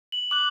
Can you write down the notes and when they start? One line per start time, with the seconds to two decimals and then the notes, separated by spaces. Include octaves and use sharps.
0.12 F#7
0.31 D6 F#6 F#7